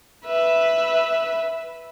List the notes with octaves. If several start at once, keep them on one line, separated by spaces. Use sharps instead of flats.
B4 E5